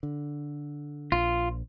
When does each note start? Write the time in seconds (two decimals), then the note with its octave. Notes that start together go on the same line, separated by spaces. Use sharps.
0.03 D3
1.12 A#1 F4